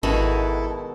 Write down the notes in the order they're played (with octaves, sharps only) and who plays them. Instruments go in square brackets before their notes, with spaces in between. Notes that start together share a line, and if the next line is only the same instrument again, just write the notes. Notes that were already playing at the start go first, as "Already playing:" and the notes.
[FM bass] G#1 [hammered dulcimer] B2 [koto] D#3 G#3 F#4 [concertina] E4 A4